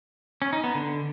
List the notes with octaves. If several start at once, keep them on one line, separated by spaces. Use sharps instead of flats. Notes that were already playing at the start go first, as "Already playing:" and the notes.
C#4
D#4
B3
D3